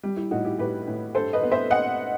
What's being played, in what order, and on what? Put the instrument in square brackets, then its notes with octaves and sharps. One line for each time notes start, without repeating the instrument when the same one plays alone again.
[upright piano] G3
E4
A2 D#4 F#4
E4 G4
A2 G4 B4
A2
G2 A4 C5
B4 D#5
B3
C5 E5
D#5 F#5